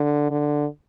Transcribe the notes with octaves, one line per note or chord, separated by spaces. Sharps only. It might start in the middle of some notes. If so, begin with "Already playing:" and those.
Already playing: D3
D3